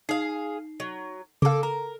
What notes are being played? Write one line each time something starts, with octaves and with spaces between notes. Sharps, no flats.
D#4 G#4 F5 C7
F#3
C#3 A#3 A4 F5 D6
A#4 A#5